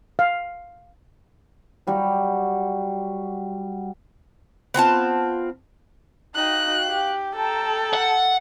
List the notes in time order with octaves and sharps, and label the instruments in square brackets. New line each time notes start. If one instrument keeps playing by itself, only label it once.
[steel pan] F5
[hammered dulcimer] F#3 G3 F#4
[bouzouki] B3 C4 F4 A5
[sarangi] D#4 [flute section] F#4 F5 G5 [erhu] F#6
[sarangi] G4
[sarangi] A4 [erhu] G5 [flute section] A5 A#5
[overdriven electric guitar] F#5